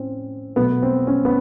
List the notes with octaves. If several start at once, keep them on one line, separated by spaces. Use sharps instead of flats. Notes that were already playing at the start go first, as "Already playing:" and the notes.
Already playing: A2 C4 C#4
B2 F#3 A3 B3
C4
C#4
B3